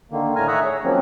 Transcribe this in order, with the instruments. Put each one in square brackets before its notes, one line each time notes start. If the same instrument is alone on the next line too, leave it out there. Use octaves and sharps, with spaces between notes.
[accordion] D3 D#3 A#3
A2 D3 A3 G#5 A#5 F6
E5 A#5 C#6 D#6 E6 F#6
G#4 C#5
D#3 F3 F#3 A#3 C4 C#4